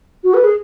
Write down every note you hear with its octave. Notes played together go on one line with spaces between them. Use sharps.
F#4
B4
G#4